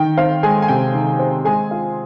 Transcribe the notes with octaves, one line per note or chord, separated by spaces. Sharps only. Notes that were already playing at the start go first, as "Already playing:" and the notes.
Already playing: D#3 G5
C4 F5
G#3 G#4 G#5
G#5
C3 G5
D#3
C4
G#3 G#4 G#5
F4